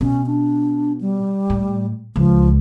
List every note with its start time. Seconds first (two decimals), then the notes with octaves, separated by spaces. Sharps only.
0.01 B2 C#4
0.27 D4
1.01 G3
1.50 A2
2.16 C#2 F3